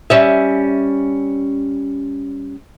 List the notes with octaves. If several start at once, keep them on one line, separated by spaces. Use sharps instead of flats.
G3 C#4 E5